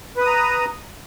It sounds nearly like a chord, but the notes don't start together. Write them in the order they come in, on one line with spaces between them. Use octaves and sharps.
B4 D#6 A#5